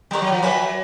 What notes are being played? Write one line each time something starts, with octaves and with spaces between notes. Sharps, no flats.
G3 G4 A#4 C#5
F#3
F3
F#3 B4 E5 G#5 B5